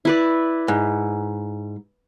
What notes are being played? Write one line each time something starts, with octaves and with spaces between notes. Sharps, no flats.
E4 B4 D5
G#2